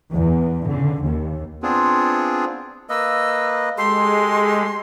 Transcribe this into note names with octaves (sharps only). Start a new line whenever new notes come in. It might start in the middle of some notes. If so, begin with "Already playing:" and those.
E2
D3
D#2
B3 C4 D4 F4 G#4
A#3 B4 D#5 E6
G#3 G4 A4 C6